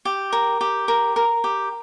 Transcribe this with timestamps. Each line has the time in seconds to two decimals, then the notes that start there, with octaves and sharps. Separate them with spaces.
0.05 G4
0.32 A#4
0.61 G4
0.88 A#4
1.16 A#4
1.44 G4